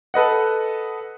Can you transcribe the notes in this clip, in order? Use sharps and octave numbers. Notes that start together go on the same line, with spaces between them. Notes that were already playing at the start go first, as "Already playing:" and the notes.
A4 B4 D#5 F#5